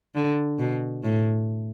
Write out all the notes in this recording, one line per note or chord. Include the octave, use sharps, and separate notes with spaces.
D3
B2
A2